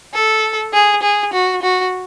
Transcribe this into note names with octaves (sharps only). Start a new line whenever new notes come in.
A4
G#4
G#4
F#4
F#4